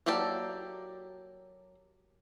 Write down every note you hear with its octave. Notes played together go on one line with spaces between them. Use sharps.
F#3 A#3 G4 A4 D5